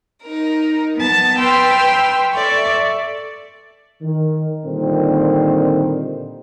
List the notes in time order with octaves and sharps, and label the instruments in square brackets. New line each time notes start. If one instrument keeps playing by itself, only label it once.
[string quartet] D#4 A#4
B3 A5
B4 G5 C6 E6 F6
A4 D5 E5 C#6
[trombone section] D#3
A#2 D3 D#3 G3 C4